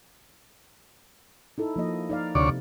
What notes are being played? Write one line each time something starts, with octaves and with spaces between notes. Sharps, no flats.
D#4 E4 A4
F3 A#3 D#5
D#4 D5 F5
D2 C3 C#5 D5